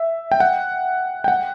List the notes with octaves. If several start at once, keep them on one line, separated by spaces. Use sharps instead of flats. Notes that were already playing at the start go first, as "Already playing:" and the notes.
Already playing: E5
G5
F#5
G5
F#5